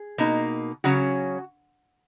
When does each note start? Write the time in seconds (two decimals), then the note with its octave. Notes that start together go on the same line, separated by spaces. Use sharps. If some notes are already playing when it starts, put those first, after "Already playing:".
Already playing: G#4
0.18 B2 A#3 D#4
0.84 C#3 F#3 C#4 F#4